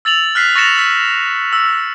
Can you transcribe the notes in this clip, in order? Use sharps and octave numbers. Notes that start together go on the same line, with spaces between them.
E6 A6 F7 F#7
F6 F#6 B6 C7
C#6 A6 A#6 C#7 E7 F7
E6 B6
E6